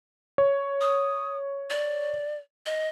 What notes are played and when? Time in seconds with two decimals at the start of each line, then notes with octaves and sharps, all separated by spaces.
0.38 C#5
0.81 D#6
1.70 D5
2.66 D#5